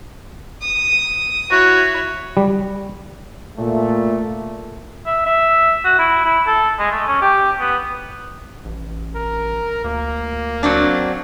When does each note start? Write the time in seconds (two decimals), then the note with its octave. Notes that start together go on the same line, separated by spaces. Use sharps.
0.62 D#6
1.51 E4 F#4 C#5
2.37 G3
3.57 A#2 A3
5.06 E5
5.26 E5
5.85 F#4
5.99 E4
6.25 E4
6.47 A4
6.79 G#3
6.92 A3
7.07 C#4
7.21 G4
7.60 B3
8.65 A1
9.15 A#4
9.85 D2 A#3
10.63 F#3 C4 D4